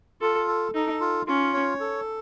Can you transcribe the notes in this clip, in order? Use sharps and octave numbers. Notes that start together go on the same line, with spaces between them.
F4 A4
A4
D#4 A4
F4
C#4 F4
C#5
A4